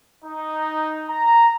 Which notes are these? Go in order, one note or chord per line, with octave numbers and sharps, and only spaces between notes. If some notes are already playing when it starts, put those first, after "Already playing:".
D#4
A#5